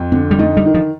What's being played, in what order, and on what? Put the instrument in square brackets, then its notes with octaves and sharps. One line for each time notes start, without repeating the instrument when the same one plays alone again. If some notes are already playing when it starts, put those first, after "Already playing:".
Already playing: [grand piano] F2
[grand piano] D3 [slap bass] C4
[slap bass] G3
[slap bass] A3 [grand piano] D#4
[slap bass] G3
[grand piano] D#3
[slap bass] F3